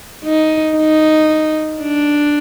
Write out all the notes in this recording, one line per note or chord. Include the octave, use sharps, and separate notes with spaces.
D#4
D#4
D4